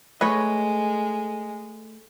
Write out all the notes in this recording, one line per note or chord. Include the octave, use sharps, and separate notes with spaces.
G#3 A3 B4 C#5 D#5